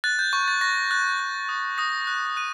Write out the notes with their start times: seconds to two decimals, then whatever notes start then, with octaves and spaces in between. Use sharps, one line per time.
0.04 F#6 A6
0.19 G6
0.33 C#6
0.48 A6
0.61 C#6 A#6
0.91 F#6 A6
1.20 F#6
1.49 D#6
1.78 D#6 A#6
2.07 F#6
2.36 F#6 D#7